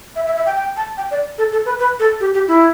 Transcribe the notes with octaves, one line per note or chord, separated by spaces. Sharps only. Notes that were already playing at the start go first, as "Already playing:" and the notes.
E5
E5
E5
G5
G5
A5
G5
D5
A4
A4
B4
B4
A4
G4
G4
E4